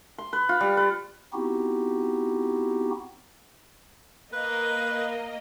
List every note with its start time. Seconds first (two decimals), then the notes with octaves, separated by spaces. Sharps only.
0.18 C6
0.33 B4
0.49 F4
0.61 G3
0.77 B4
1.33 B3 C4 D#4 E4 F#4 G4
4.33 A#3 B4 D#5